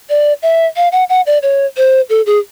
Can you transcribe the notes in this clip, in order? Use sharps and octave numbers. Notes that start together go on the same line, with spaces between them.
D5
E5
F5
F#5
F#5
D5
C#5
C5
A4
G#4